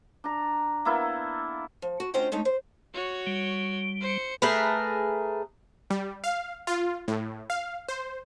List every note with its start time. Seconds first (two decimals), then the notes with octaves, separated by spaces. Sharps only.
0.24 D4 A#5
0.85 A#3 B3 E4 A4
1.82 F3
2.00 F#4
2.14 D2 C#4 F4 C5 D#5 G5
2.32 G#3 A3 C#4 D#4
2.45 C5
2.94 F#4 C#5
3.27 G3
4.01 C5 C#7
4.42 A3 G#4 A#4 B4
5.90 G3
6.24 F5
6.67 F4
7.08 A2
7.50 F5
7.89 C5